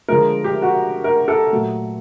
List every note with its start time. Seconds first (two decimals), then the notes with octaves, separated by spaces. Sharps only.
0.08 D3 F3 G#3 A#4
0.44 G4
0.62 F#4
1.04 A#4
1.28 A4
1.51 A#2 F#3 A3